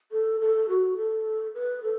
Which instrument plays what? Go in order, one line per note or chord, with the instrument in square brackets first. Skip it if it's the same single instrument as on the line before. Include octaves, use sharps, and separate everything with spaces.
[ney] A4
A4
F#4
A4
B4
A4